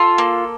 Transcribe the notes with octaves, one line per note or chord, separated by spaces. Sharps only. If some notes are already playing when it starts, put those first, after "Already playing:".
Already playing: F4 A4
A#3